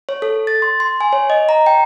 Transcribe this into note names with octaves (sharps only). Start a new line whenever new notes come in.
C#5
A4
A6
C6
C6
G#5
C#5
D#5
A#5
G5